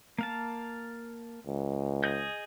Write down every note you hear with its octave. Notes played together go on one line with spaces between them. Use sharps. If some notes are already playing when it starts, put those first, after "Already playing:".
A#3 F5 A5
C#2
G#4 D#5 G6